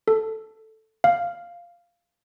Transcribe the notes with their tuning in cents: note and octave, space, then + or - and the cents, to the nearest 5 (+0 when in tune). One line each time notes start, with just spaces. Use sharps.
A4 +0
F5 -5